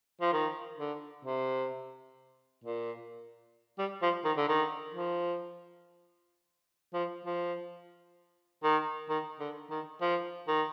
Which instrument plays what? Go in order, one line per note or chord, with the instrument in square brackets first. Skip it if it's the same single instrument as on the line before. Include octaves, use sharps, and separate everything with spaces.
[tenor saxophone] F3
D#3
D3
C3
A#2
G3
F3
D#3
D3
D#3
F3
F3
F3
D#3
D#3
D3
D#3
F3
D#3